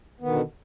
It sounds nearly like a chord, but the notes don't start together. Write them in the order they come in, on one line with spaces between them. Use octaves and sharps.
B3 D#3 B2 D3